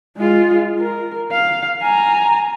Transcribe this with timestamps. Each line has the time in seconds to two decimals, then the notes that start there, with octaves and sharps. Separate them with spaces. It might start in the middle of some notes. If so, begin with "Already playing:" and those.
0.16 G#3 F4
0.79 A#4
1.32 F5
1.82 G#5 A#5